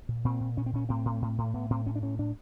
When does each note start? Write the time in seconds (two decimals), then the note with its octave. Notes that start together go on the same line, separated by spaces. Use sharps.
0.09 A#2
0.24 A#2 C4
0.41 A#2
0.57 A#2 C#4
0.66 C4
0.73 A#2 C#4
0.89 A2 C4
1.05 A2
1.22 A2
1.38 A2
1.54 A2 B3
1.70 A2 C4
1.86 A2 C#4
1.95 D4
2.02 A2 C#4
2.19 A2 D4